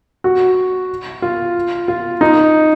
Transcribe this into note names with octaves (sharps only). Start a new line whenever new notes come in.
F#4
F4
F4
D#4